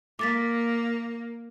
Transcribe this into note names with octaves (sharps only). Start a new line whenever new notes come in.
A#3 D6 A6 B6